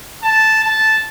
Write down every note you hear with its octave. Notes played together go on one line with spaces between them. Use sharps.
A5
A5